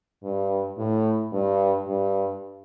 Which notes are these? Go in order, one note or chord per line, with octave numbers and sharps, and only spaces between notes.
G2
A2
G2
G2